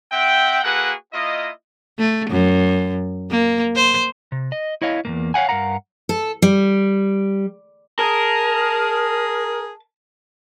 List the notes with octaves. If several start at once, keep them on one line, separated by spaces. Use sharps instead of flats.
C4 E5 F#5 G5
A#3 F#4 G#4 A4 B4 F#5
A#3 E4 F4 D#5
A3
F#2
A#3
C5
C3
D#5
E4 C#5 D#5 F5
E2 G2 A#3
C#5 F5 F#5 G#5
G2 A#4 F5 F#5 A#5
A4
G3
G#4 A#4 A5